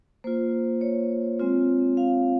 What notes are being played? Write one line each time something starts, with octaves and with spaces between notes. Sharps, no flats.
A#3 F4 C5
C#5
G#3 C4 F4
F5